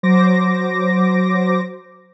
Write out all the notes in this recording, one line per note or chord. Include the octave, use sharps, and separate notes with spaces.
F#3 C5 D6 A#6